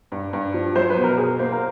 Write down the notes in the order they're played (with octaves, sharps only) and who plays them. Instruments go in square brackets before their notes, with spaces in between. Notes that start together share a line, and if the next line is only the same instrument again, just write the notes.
[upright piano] G2
G2
F3
[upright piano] F#3 [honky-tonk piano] C5
[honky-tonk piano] B4
[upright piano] B2
[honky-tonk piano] A#4
[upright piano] B2 [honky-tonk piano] G#4
[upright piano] A#3 [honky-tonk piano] C5
[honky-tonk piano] A#4